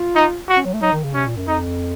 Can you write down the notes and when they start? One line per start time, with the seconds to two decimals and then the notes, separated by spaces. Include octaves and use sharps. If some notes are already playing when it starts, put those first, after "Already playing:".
Already playing: F4
0.15 D#4
0.48 F#4
0.57 C#4
0.65 F#3
0.73 A3
0.81 F#3 D#4
0.92 D#3
1.04 C#3
1.14 C3 C#4
1.26 A#2
1.37 F#2
1.47 F2 D#4